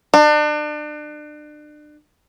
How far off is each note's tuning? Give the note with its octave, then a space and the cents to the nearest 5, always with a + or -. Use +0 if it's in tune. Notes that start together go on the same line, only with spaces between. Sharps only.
D4 +35